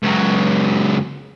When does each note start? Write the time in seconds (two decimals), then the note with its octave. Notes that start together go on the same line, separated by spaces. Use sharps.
0.03 C#2 F#3